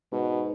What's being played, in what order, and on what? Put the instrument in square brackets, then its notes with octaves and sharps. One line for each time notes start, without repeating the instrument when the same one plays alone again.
[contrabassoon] G#2 [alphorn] B2